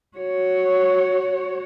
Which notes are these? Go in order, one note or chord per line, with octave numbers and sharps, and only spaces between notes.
F#4 C#5